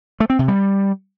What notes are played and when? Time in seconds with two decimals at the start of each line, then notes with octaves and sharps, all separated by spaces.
0.20 A3
0.30 C4
0.39 C3
0.48 G3